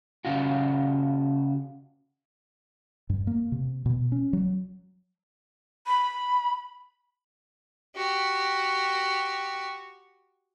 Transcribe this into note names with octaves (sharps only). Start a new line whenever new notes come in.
C#3 F4 F#4
G2
A#3
C3
B2
C#4
F#3
B5
F#4 G4